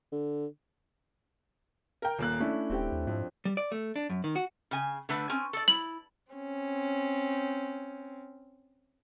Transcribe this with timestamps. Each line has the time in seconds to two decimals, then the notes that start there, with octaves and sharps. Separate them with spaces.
0.12 D3
2.02 A#4 G5
2.19 D#1 A#3 F#6
2.40 A3 C#4 D4 E4
2.70 D#1 C4 G4 G5
2.92 D#2
3.07 F2 G#2
3.45 G3
3.57 D5
3.72 A3
3.96 D4
4.10 F#2
4.24 D#3
4.36 F#4
4.71 C#3 G#5
5.09 D3 A3 B4
5.29 C4 C#4 G#5
5.53 A4 D5
5.68 E4 F#7
6.32 C4 C#4